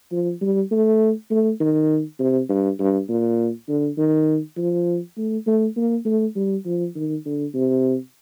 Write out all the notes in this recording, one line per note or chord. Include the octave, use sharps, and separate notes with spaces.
F3
G3
A3
A3
D#3
C3
G2
G2
A#2
D3
D#3
F3
A3
A3
A#3
A3
G3
F3
D#3
D3
C3